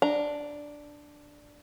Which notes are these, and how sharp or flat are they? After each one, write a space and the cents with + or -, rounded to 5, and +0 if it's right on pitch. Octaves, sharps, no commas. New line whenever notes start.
D4 +0 A#5 +0